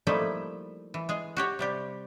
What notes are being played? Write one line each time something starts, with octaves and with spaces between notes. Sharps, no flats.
F3 G3 A3 A#3 D#4 E4
E3
G#3 G#4
F#4 G4 C#5
C3 G3 G4